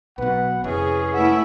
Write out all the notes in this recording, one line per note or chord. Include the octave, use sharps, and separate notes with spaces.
B1 B2 B4 F#5
F1 E3 C#4 G#4
A3 B3 E4 E5